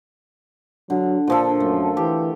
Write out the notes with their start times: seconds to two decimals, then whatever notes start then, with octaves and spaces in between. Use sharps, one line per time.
0.90 D3 F#3
1.27 A#2 F3 D4 A4
1.60 F#2 A3
1.97 E3 G4